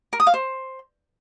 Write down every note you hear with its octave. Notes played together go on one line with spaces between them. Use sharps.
A#4
D#6
F5
C5